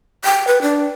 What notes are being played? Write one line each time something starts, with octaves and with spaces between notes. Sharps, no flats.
G5
B4
D4